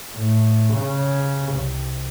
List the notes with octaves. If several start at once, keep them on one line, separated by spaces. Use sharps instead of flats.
A2
C#3
C2